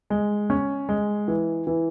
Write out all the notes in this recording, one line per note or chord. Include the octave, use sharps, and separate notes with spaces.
G#3
C#4
G#3
E3
E3